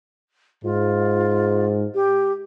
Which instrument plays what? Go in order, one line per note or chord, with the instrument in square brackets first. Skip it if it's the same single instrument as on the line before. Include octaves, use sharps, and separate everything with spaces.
[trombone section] G#2 [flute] F4
[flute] G4